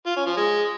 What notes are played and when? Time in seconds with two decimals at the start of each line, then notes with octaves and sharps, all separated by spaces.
0.06 F4
0.16 C#4
0.26 F3
0.37 G#3